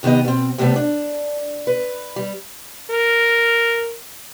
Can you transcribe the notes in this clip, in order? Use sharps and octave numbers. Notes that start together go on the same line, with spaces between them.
C3 D#3 B3 G4 D#5
B2 C4
A2 C3 G3 A3 B3
D4
B4
G3
A#4